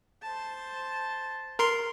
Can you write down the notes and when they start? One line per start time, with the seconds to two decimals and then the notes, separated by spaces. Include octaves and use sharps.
0.23 C5 A5
1.59 A#4 C6